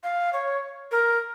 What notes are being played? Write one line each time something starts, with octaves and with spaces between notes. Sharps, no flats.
F5
C#5
A#4